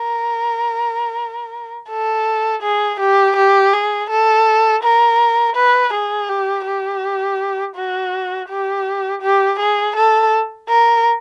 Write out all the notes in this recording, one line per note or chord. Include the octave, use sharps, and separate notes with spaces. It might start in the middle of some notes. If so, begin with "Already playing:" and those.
Already playing: A#4
A4
G#4
G4
G4
G#4
A4
A#4
B4
G#4
G4
G4
F#4
G4
G4
G#4
A4
A#4